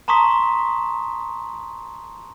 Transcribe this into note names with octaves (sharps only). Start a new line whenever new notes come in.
A5 A#5 C6 C#6 D#6 B6